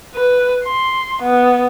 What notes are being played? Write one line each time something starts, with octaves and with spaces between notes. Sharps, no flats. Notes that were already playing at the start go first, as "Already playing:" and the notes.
B4
C6
B3